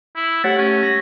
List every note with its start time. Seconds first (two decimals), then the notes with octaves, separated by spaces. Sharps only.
0.16 E4
0.44 A3 G4 C#5 F#5 A6
0.58 C#4
0.83 A#6